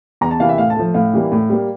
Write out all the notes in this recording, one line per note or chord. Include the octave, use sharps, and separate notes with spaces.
E2 A#5
A5
C3 E3 A#3 F5
E5
A2 F5
A5
F3 A3
A2 F5
E3 G3 A#3
A2
G3 A#3